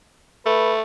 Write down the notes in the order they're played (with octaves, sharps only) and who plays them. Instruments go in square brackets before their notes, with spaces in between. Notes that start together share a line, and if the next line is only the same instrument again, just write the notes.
[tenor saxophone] A3 [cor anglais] B4